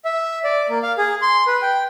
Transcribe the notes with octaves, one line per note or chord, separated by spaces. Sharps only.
E5
D5
A#3
F5
G#4
C6
B4
G5